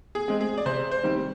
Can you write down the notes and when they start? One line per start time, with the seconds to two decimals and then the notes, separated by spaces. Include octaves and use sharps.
0.15 G#4
0.28 G#3 C4
0.41 G#4
0.58 D5
0.66 C3 C5
0.91 C5
1.03 D#3 G3 C4